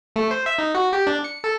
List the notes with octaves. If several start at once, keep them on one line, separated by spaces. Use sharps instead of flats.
A3
C5
E5
D#4
F#4
G4
D4
C#7
A4